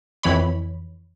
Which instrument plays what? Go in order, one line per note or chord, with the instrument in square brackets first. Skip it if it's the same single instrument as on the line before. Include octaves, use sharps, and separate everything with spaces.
[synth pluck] F2 E3 C#5 B5